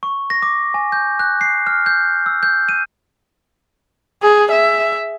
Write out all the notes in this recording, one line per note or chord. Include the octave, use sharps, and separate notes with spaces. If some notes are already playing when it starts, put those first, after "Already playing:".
C#6
A#6
D6
G#5
G6
F#6
C7
F6
G6
E6
G6
D#7
G#4
E5